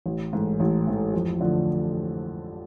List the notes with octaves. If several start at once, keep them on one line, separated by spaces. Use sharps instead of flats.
A1
G#2 E3 A3
A1
G#2 E3 A3
F2
D3 F3 A3